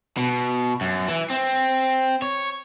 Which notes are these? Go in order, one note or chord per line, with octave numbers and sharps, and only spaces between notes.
B2
F#2
E3
C4
C#5